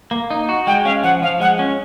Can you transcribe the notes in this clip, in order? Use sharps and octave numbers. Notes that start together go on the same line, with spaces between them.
A#3
D#4
F#4
G#3 G5
C#4 F5
F3 F#5
F3 F5
G#3 F#5
C#4